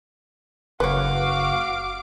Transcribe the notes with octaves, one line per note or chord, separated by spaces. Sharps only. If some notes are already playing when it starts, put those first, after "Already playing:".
F#1 F#4 B4 C#5 F5 D6